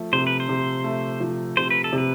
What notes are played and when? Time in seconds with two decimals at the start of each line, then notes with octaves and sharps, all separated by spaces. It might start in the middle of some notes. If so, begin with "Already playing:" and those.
Already playing: F3 A3
0.13 C3 C5
0.27 B4
0.40 C5
0.49 C3
0.84 A3
1.20 F3
1.57 C3 C5
1.70 B4
1.84 A4
1.93 C3
1.98 B4